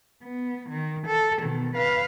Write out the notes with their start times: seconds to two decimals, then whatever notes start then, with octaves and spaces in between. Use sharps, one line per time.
0.23 B3
0.70 D#3
1.07 A4
1.42 B2 D#3
1.75 B4 F5